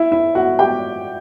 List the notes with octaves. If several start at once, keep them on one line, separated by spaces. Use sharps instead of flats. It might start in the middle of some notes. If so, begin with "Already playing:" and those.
Already playing: E4 E5
E4 E5
F#4 F#5
G4 G5